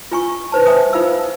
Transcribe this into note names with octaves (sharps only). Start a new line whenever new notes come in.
F4 G#5 C#6
D#4 B4 C5 A5
C5 E5 G#5 D#6
D#4 F4 F5 E6